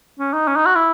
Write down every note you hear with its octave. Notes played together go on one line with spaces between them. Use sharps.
C#4
D#4
C#4
D#4
F#4
E4